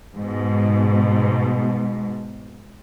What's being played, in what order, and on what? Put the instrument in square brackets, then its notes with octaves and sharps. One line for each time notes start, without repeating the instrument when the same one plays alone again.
[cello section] G#2 B2